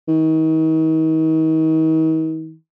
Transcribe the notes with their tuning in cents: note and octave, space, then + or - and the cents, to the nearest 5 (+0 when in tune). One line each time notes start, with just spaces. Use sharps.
D#3 +40